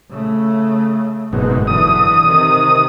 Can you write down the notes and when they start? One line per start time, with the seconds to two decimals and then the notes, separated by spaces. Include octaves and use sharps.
0.10 C#3 A3
1.33 F#1 G#2 B2
1.67 D3 E3 D#6
2.26 C3 D#3